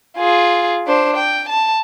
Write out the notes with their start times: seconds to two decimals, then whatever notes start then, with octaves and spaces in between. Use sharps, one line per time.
0.17 F4 G#4
0.87 D4 C5
1.17 G5
1.49 A5